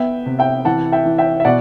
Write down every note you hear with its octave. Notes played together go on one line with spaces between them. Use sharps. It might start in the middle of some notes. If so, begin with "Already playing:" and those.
Already playing: B3 E5 G5
C3
E5 G5
E3 F#5 A5
E5 G5
E3
E5 G5
E5
B2 D5 F#5